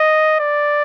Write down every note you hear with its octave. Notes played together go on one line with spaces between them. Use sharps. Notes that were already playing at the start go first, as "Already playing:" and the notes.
Already playing: D#5
D5